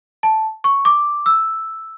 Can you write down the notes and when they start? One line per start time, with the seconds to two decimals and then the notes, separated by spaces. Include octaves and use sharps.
0.23 A5
0.64 C#6
0.85 D6
1.26 E6